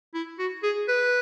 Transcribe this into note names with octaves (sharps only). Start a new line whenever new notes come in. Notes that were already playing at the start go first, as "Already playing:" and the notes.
E4
F#4
G#4
B4